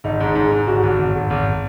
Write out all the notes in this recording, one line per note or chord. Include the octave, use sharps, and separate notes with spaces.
G#1 D#4
G#2
G#2
G#2
G#1 F#4
G#1
G#1
G#1
G#1